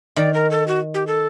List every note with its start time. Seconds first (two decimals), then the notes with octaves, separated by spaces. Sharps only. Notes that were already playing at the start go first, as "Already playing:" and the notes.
0.16 D#3 D5
0.34 A#4
0.51 A4
0.68 F#4
0.94 G4
1.07 A4